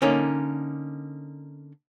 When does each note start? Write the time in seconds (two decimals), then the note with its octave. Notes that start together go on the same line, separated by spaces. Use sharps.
0.02 D3 A#3 C#4 D#4